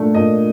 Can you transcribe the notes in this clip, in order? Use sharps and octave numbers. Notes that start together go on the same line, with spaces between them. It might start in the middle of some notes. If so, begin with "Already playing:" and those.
Already playing: A#2 A3 D4
A#2 D#5